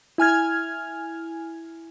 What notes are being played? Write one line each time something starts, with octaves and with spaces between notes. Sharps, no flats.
E4 G#5 F6 G#6